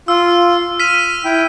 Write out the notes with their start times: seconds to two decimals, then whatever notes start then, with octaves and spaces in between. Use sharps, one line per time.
0.08 F4 E6
0.80 F6 B6 D#7
1.25 E4 G5